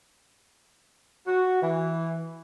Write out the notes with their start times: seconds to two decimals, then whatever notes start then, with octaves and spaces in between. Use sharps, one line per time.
1.27 F#4
1.62 E3